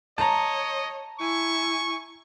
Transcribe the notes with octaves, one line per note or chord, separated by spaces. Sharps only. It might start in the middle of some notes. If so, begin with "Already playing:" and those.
C#5 D#5 A5 A#5
E4 G#5 C#6